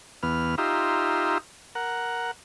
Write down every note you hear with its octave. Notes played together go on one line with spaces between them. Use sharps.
E2 B3 F6
D#4 F4 G4 E5 A#5 C6
A#4 F#5